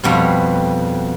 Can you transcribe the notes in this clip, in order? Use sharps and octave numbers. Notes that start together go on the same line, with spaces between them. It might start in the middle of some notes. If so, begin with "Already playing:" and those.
F2 B2 G3